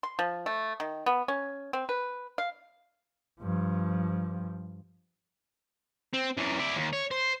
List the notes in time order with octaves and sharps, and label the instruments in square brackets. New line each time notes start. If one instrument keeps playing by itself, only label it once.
[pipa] C6
F3
A3
D#3
B3
C#4
C4
B4
F5
[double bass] G2 F3
[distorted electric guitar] C4
F#2 E3
E4 D5
D#2
C#5
C5